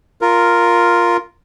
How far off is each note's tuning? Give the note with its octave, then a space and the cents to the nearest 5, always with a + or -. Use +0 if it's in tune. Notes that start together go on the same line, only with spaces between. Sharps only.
F4 +0 A#4 +0